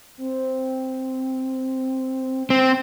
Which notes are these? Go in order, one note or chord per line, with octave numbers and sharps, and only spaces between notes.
C4
C4